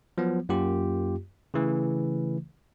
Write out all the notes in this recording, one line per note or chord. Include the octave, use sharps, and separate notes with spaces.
F3 F#3 B3
F#2 A#3 F4 G4
C#3 E3 A3